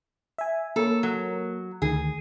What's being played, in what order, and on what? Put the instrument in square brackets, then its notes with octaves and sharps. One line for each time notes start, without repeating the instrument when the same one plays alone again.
[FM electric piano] E5 G#5
[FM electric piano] A#3 A#4 C#5 [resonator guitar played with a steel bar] A4
[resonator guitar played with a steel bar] F#3
[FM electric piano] D2 D#3 [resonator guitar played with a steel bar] G#4